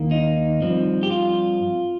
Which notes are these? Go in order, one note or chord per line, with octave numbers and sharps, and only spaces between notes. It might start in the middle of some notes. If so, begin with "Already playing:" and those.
Already playing: D#2 D#3 A#3
D#4
G2 F3 C4
G4
F4